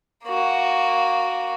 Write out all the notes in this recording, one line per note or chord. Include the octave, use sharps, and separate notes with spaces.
A#3 F#4